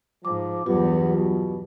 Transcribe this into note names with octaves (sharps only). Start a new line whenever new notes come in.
G#2 F3 D6
E2 G2 F#3 B3 F4 G4
B2